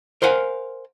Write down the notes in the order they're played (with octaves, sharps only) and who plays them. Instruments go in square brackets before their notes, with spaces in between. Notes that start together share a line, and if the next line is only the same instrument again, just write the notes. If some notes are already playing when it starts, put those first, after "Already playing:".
[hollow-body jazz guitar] A#4 C5 F5 F#5 G#5